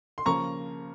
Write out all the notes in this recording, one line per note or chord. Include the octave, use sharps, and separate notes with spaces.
C6
C#3 F3 A#3 A#5 C#6